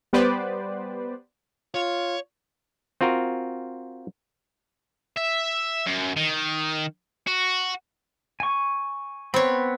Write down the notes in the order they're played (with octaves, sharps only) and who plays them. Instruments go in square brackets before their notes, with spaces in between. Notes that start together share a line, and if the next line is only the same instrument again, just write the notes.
[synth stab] G3 B3 G4 B4 C5 D5
[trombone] F4 [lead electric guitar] C#5
[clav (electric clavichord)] C4 F4 F#4 A#4
[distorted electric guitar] E5
F#2
D#3
F#4
[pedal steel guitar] G#5 C#6
[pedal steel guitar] B3 B5 [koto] C4 C#5